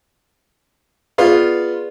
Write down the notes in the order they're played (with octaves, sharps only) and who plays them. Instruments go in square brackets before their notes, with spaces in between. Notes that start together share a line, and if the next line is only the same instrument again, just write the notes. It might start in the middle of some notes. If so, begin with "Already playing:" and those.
[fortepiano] B3 F4 [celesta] G#4 B4 D5